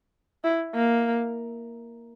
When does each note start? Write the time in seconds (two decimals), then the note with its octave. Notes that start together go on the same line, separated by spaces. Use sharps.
0.44 E4
0.75 A#3